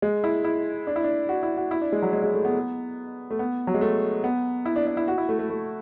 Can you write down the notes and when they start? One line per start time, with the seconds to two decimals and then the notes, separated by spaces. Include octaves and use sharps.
0.02 G#3
0.24 E4
0.44 E4
0.87 D4
0.96 E4
1.04 D4
1.29 F#4
1.43 E4
1.57 F#4
1.71 E4
1.81 D4
1.92 G#3
2.02 F#3
2.13 G#3
2.24 G#3
2.34 A3
2.45 B3
3.31 A3
3.39 B3
3.67 F#3
3.74 G#3
3.81 A3
4.24 B3
4.66 E4
4.76 D4
4.87 D4
4.97 E4
5.08 F#4
5.18 E4
5.29 A3
5.39 A3
5.50 A3